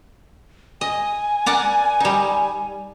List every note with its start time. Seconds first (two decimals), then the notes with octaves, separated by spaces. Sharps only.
0.81 D#5 G#5
1.46 A#4 D5 F#5
2.00 G3 D#4